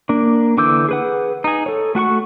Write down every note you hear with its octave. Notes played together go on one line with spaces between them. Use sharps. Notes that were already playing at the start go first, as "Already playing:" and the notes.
A#3 D4
D3 E3 D6 E6 G6
G#4 B4 F#5
D#4 G#4
A4 C#5
A3 F#4 F#5 C#6